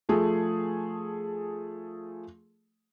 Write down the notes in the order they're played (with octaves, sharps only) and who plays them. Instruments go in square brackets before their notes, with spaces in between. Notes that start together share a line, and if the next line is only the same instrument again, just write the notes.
[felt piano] F3 A3 G#4